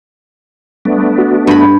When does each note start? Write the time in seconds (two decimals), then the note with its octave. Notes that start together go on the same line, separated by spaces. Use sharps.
0.85 G3 A3 B3 D4
1.18 F#4
1.47 G2 B5